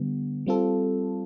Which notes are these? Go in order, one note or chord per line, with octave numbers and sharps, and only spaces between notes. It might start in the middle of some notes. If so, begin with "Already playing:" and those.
Already playing: D3 G3 B3
G3 C4 F4 A4